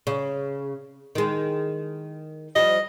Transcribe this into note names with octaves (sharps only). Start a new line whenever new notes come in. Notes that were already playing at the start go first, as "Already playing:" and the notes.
C#3
D#3 G#3
F3 G3 D#5